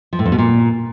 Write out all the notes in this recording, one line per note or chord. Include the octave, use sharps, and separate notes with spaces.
F3
A2
F2
B2
A#2